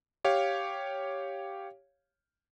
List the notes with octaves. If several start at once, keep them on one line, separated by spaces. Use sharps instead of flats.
G4 C#5 F5